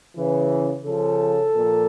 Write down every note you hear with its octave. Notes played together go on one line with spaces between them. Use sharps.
C#3 E3
C#3 F3 A4
A#2 F3